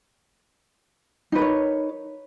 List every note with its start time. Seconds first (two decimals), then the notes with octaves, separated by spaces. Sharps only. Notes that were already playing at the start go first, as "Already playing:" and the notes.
1.32 D#4
1.35 B4
1.38 A#4
1.41 C#5